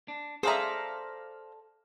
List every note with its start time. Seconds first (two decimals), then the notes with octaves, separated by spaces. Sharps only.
0.08 D4
0.43 G#4 A4 C5 D5 E5 F5 A#5